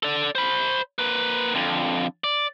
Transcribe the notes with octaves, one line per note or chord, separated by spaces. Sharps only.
A4 D5
C5 B5
A#3 B4
F2 D3
D5